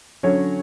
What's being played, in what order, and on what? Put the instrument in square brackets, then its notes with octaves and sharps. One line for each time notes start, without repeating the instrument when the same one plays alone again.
[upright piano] D3 F#3 C#4 C#5